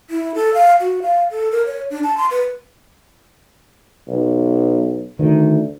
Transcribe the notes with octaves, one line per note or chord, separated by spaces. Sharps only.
E4
A4
F5
F#4
F5
A4
A#4
C#5
D4
A5
C6
B4
B1
D2 D#3